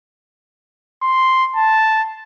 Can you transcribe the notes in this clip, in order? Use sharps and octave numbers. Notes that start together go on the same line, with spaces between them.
C6
A5